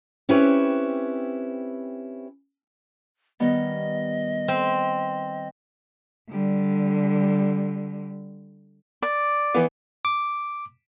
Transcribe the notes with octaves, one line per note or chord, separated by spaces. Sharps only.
C4 C#4 E4 G4 B4 C#5
D#3 G3 B3 D#5
C4
D3 G3
D5
E3 B3
D6